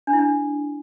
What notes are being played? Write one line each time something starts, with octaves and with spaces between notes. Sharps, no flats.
D4
E4
D4